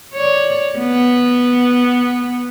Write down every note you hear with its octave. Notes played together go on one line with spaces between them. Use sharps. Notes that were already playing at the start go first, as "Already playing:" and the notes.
C#5 D5
B3